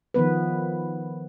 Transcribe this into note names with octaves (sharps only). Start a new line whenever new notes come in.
D#3 F3 B3 B4